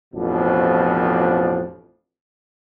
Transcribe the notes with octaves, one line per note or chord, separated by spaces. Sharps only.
A1 F2 B2 F3 D4